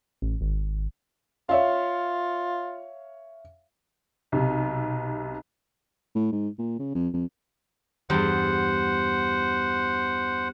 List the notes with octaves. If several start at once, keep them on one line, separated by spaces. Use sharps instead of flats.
A1
G#1
F4 C#5 E5 F5
B1 C3
A2
G#2
A#2
C#3
F2
F2
E2 G2 G3 C5 F#5